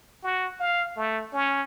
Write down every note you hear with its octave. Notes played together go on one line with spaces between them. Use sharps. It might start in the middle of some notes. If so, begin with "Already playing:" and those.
F#4
F5
A3
C#4